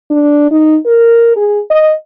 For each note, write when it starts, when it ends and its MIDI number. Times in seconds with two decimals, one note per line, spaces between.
0.11 0.51 62
0.51 0.77 63
0.86 1.32 70
1.36 1.60 68
1.71 1.93 75